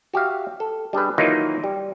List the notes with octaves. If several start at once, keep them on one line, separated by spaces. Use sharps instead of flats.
F#4 G4 E5 F5
A4
G3 D4 G#4 B4
D#3 E3 F#3 A#3 D#4 F4
G3